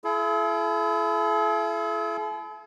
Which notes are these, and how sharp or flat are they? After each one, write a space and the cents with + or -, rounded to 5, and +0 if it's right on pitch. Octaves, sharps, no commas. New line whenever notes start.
E4 +35 A4 -45